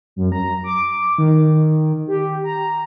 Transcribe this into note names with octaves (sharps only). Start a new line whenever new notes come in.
F#2
A#5
D6
D#3
G4
A#5